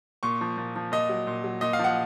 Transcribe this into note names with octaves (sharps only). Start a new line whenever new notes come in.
A#2 C#6
F3
A#2
F3
A#2 D#5
F#3
A#2
F#3
A#2 D#5
F5
F3 F#5